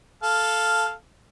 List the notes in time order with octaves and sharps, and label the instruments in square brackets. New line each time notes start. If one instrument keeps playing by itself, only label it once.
[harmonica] A4 F5